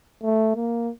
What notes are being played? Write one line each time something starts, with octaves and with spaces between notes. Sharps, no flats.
A3
A#3